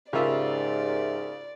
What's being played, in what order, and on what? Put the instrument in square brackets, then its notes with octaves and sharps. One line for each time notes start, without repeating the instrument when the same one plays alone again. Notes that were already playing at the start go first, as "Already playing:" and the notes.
[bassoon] G#2 [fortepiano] C#3 F4 [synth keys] G4 A#4 E5 [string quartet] D5